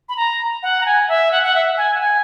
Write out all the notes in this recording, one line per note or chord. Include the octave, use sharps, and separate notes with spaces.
B5
A#5
F#5
A#5
G#5
E5
F#5
F#5
E5
G#5
F#5
G#5